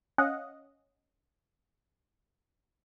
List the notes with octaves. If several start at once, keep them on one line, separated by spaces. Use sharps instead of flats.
C#4 D#5 F5 F#5